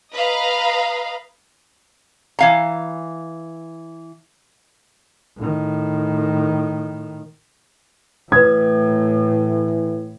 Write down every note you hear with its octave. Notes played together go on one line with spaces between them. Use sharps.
B4 D#5 F5 A#5
E3 F5 A#5
A2 D#3
A2 E3 B4 D#6 G#6